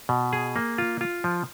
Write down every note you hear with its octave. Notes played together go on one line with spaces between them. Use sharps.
B2
G#4
A#3
F4
F4
F3